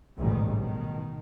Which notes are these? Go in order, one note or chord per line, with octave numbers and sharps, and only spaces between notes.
A1 D2 G#2 B2 D#3 G3
B2 D#3